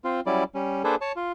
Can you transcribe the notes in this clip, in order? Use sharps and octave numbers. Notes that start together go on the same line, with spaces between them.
C4 F4
F#3 G3 C#4 E4 D5
G3 C#4
A#3 D4 G#4 A4 B4 C5
C#5 A5
F4